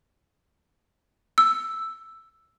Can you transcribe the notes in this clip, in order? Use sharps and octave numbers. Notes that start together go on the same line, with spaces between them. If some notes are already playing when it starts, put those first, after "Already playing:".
E6